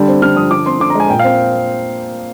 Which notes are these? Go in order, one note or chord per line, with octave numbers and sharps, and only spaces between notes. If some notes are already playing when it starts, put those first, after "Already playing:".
Already playing: D3 G3
C4
D3 F6
F3 D#6
D3 D6
C4 C6
D3 D6
A#5
G#3 G#5
A#2 G5
F5
C4